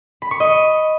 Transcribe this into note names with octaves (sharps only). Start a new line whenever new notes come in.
B5
C#6
D#5